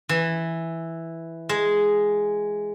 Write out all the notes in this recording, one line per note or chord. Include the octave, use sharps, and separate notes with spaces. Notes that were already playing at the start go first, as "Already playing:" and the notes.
E3
G#3